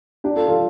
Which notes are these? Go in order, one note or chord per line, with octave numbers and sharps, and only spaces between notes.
D4 G4
F4 A4
F4 A4